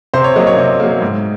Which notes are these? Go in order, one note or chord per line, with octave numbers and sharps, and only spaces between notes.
C3 C5
C#5
F#3 A#3 D#5
C#5
C3 D#5
F#3 A#3
G#2